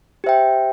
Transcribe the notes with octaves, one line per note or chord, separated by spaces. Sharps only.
G4 C5 E5 G5